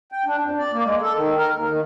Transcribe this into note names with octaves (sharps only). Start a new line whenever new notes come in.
G5
D4
F2
D5
A#3
G#3
A4
D#3
A#4
D#2
D#3